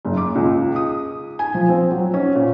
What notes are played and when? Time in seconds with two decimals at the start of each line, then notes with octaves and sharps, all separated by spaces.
0.05 F#1
0.17 D6
0.35 C#2
0.76 D#6
1.39 G#5
1.54 F3
1.69 C4
1.91 F#3
2.14 C#4
2.35 A#2